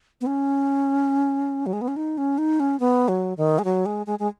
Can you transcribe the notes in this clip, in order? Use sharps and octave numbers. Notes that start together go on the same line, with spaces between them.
B3
C#4
F#3
G#3
B3
C#4
D#4
C#4
D#4
C#4
B3
F#3
D#3
G#3
F#3
G#3
G#3
G#3